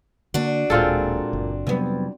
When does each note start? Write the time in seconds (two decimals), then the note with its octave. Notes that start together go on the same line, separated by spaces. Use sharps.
0.34 D3 A#3 D4 F#4
0.70 D1 A#2 G#3 C4 F4 A4
1.33 F#1
1.67 F2 C3 F#3 G3 B3